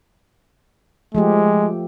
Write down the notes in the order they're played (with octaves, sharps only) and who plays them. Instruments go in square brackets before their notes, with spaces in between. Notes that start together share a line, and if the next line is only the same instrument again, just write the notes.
[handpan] F3 A3 G4 [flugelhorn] G#3